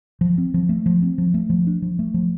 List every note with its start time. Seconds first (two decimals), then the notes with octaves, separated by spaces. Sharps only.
0.21 F3
0.38 C4
0.54 F3
0.69 A3
0.86 F3
1.03 C4
1.18 F3
1.34 A3
1.50 F3
1.67 D4
1.82 F3
1.99 A3
2.14 F3